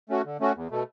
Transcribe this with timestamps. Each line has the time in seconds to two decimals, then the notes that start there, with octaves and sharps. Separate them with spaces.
0.09 A3 C#4 F#4
0.25 D3
0.40 A3 C#4 F#4
0.56 E2
0.71 B2 A3